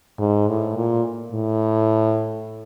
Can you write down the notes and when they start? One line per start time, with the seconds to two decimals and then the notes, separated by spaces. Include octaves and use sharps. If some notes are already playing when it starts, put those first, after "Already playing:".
0.18 G#2
0.47 A2
0.76 A#2
1.32 A2